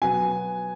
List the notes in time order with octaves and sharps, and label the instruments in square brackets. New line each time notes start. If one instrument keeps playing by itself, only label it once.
[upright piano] B2 F#3 B3 [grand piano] G#5